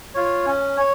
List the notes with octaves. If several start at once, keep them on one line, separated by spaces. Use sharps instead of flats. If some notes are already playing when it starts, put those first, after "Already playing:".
F4 C#5
C#4
C#5